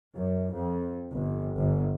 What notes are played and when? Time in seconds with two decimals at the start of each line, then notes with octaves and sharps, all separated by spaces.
0.16 F#2
0.54 F2
1.12 G1
1.58 G1